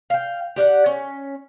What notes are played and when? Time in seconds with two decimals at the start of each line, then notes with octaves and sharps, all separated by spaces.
0.10 F5 G5
0.56 G4 D5 F5 F#5
0.86 C#4